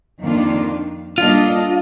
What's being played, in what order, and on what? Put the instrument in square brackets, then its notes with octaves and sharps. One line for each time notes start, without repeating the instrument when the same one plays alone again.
[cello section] F2 D#3 A#3 D4 F4
[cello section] G3 A#3 D4 A4 D#5 [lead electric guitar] F4